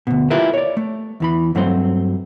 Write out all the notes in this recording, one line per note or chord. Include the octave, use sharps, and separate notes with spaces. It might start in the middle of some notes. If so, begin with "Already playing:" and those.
D2 G#2 B2
E4 F4 G4 A#4 B4 E5
C#5 D5
A3
E2 E3 B5
G2 F#3 A3 C4 C5